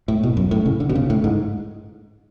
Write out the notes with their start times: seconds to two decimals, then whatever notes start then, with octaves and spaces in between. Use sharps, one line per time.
0.08 A2
0.23 B2
0.37 F#2
0.51 A2
0.66 C#3
0.80 D3
0.89 B2
0.95 C#3
1.10 A2
1.24 G#2